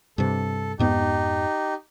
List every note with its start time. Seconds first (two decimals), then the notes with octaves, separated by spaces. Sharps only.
0.18 G2 C3 A4
0.79 F2 G#2 B3 D#4 G4